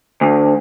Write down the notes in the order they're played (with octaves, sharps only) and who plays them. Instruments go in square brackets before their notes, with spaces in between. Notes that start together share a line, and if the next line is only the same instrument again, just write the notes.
[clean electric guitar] D2